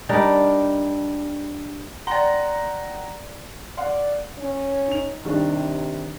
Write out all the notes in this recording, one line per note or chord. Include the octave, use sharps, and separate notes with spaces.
G3 D4 D#4 A#4
D5 F#5 G5 A#5 C6
D5 F5 F#5 C6
C#4
D#4 F7
C3 D#3 G3 D4